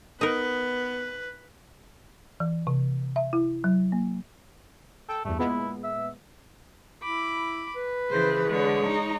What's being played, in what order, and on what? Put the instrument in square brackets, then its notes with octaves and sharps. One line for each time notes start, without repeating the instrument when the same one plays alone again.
[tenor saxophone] B3 [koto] D#4 A#4 [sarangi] B4
[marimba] E3
C3
E5
E4
F#3
A#3
[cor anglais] A4 [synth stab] G5
[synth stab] E2 G2 [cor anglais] A3
[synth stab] A#2 G#3 B3 [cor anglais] E4
[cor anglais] E5
[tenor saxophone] E4 [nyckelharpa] B5 D6
[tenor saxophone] B4
[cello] C#3 E3 [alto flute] G#4 [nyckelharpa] C5
[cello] D3 [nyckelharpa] G#3 C#5
[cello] D#4